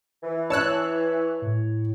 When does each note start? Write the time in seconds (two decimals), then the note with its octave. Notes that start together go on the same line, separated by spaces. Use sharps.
0.23 E3
0.50 C#5 A5 E6 F#6
1.42 A2